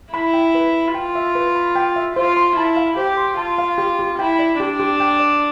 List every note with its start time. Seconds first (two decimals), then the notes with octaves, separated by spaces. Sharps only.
0.14 E4 B5
0.34 G5
0.55 B4
0.74 B5
0.94 F4 G5
1.15 E5
1.35 B4
1.56 B5
1.76 G5
1.96 E5
2.16 F4 C5
2.37 C6
2.56 E4 A5
2.76 F5
2.97 G4 C5
3.17 C6
3.37 F4 A5
3.58 F5
3.78 G4
3.99 G4
4.19 E4 G5
4.39 D5
4.60 D4 G4
4.80 G4
5.00 G5
5.20 D5